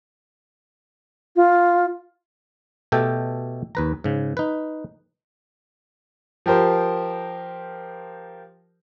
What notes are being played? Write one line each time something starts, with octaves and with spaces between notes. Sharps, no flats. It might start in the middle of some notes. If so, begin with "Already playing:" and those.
F4
B2 A3 G4 A4 G5
D#2 B4 A#5
G#2 C#3
D#4 B4
F3 G4 A#4 C5